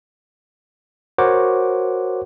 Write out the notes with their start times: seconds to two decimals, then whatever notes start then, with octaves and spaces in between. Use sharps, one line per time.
1.18 F#4 A#4 C5 C#5 F#5 D6